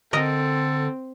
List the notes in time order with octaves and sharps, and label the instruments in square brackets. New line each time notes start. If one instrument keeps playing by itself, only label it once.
[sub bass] D3 [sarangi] C4 [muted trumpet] A4 [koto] A#4 D#5